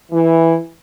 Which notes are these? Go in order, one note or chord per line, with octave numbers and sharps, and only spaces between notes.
E3